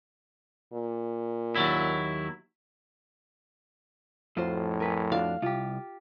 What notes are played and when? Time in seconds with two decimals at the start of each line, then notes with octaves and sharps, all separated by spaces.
0.74 A#2
1.56 D#2 F#3 E4
4.37 F2 A2 F4 F#4 C5
4.80 A#4 B4 G#5
5.12 D4 F4 F#4 F5
5.42 C2 F4 G4